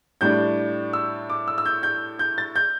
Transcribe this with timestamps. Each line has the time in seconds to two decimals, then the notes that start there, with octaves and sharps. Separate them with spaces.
0.21 A2 G3 D4 G6
0.93 E6
1.30 D6
1.48 E6
1.58 E6
1.66 G6
1.83 G6
2.19 G6
2.38 A6
2.56 G6